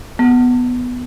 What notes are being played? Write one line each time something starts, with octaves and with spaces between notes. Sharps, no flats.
B3